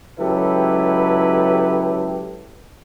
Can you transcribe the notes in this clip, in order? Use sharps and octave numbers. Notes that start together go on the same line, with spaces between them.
C#2 F#3 E4 G4 A4 B4